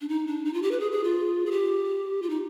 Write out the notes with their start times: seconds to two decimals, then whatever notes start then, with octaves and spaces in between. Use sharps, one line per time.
0.01 D4
0.09 D#4
0.27 D4
0.45 D#4
0.54 F4
0.62 G4
0.71 B4
0.80 G#4
0.92 G#4
1.04 F4
1.46 G#4
1.51 G4
2.22 F4
2.30 D#4